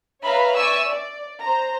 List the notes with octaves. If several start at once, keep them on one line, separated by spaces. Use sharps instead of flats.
B4 C#5 E5 F5 A#5 B5
D5 E5 G#5 C#6 E6
D5
C5 A#5